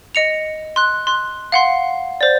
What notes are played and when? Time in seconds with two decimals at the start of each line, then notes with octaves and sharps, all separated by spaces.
0.15 D#5 C#7 F7
0.76 C6 F#6
1.07 C6 F#6
1.52 F5 F#5 C6
2.21 C5 D5